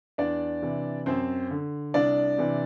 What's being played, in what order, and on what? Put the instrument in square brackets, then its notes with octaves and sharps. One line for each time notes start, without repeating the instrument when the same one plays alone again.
[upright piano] E2 D4 D5
C3 E3
F#2 C4 C5
D3
C2 D4 D5
C3 E3